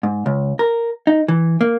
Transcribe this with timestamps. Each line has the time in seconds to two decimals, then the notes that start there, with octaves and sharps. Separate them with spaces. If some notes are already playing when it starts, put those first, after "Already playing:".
0.03 G#2
0.26 C#2
0.59 A#4
1.07 D#4
1.28 E3
1.61 A#3